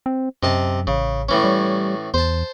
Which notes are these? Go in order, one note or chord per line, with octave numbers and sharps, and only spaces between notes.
C4
F#2 C3 D#5 A5
A1 C#3
A2 E3 C#4
G3
E2 C5 A5